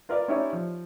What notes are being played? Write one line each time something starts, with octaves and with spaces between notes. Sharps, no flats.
F4 A#4 B4 D5 D#5 F5
C#4 D#4 E4 G4 C#5 D5
F3